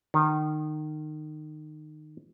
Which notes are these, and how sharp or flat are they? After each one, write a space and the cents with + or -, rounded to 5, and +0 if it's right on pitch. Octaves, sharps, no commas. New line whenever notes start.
D#3 -25